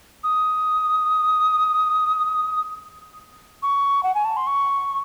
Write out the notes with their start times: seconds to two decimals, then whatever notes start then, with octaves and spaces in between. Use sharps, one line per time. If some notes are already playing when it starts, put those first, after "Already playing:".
0.24 D#6
3.63 C#6
4.03 F#5
4.15 G#5
4.25 A5
4.37 C6
4.47 C#6